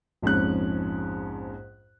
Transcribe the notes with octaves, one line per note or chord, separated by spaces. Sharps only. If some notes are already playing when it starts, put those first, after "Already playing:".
A#1 F2 G#2 C#4 F#6